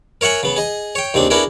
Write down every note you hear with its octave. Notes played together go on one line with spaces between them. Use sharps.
A#4 C#5 E5 F#5 G#5
C#3 B3
G#4 D#5
C#5 G5
D#2 C#3 C4 D4
B3 D4 E4 F#4 G#4 A#4